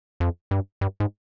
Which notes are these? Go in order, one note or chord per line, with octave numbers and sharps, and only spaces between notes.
F2
G2
G2
G#2